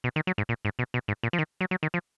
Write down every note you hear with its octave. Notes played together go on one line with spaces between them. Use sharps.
B2
D#3
F#3
G#2
A#2
G#2
B2
B2
G#2
A#2
F3
D#3
F#3
F#3
D#3
F3